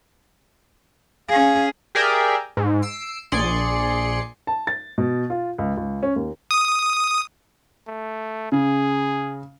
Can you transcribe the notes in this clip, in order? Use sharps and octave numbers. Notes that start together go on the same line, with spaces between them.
C#4 G#4 F5
G4 G#4 A#4 D5 E5 G5
G#2
E6 C7 D7
A#1 G#4 D5 C6 C#7
A5
A6
B2
F4
C#2
C#2
C#4
D#2
D#6
A3
C#3 G#4